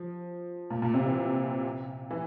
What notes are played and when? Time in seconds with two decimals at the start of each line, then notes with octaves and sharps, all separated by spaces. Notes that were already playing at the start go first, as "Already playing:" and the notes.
Already playing: F3
0.70 A#2
0.82 A#2
0.94 C3
1.05 E3
2.11 E3